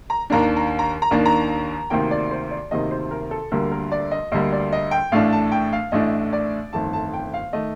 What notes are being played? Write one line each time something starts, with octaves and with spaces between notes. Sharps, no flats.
A#5
D#2 D#3 A#3 D4 A#5
A#5
A#5
A#5
D#2 D#3 A#3 D4
A#5
D2 C3 D#3 A#3 G5
D5
C5
D5
D2 C3 D#3 A#3 D#5
C5
A#4
A4
D2 D3 G3 A#3 A#4
A#4
D5
D#5
D2 D3 G3 A#3 D#5
D5
D#5
G5
A1 A2 A3 D4 F5
A5
G5
F5
A1 A2 A3 D4 D#5
D5
G1 F2 D#3 A3 A5
A5
G5
F5
D#3 A3 D#5